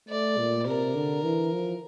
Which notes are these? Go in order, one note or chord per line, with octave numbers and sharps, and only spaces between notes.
A3 D5
A#2
C3 A#4
D3
E3
F3